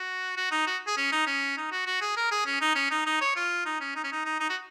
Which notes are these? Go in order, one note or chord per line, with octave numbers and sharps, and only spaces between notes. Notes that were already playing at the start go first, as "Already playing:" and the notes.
Already playing: F#4
F#4
D#4
F#4
G#4
C#4
D#4
C#4
D#4
F#4
F#4
G#4
A#4
G#4
C#4
D#4
C#4
D#4
D#4
C#5
F4
D#4
C#4
D#4
C#4
D#4
D#4
D#4
F#4